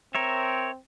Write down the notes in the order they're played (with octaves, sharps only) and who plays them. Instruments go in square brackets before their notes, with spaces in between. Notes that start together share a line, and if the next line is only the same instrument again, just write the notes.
[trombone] C4 [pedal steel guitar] A#4 C#5 E5